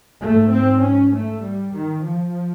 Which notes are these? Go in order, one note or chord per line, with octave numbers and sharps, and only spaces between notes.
G#2 A3
C4
C#4
A3
G3
D#3
F3